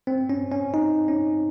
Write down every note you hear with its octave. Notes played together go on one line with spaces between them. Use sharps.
C4
C#4
C#4
D#4
C#4